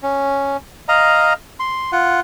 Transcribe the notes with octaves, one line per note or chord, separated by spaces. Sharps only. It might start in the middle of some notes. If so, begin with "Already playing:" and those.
C#4
D#5 F5 A#5
C6
F4 F#5